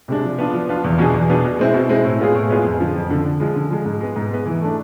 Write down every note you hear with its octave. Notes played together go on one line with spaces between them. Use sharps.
C3 G#3 D4
F3
B3 D4 F4
F3
B3 D4 F4
E2
B2 B3 D4 G#4
E2
B2 B3 D4 G#4
B2
G#3 C4 E4
B2
G#3 C4 E4
A2
G#3 B3 F4 G#4
A2
G#3 B3 F4 G#4
F2
D3 F3
F2
D3 F3
D3
F3 G#3
D3
F3 G#3
G#2
G#3 B3
G#2
G#3 B3
E3
A3 D4